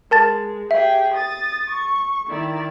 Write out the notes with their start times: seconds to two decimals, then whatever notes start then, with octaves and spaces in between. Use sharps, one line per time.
0.11 G#3 A#4 A5 A6
0.71 G4 G#4 E5 G5
1.14 D#6 A6
1.70 C#6
2.27 D#3 E4 D5